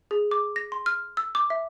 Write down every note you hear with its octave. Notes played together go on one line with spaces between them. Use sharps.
G#4
D6
A#6
C6
F6
E6
D6
E5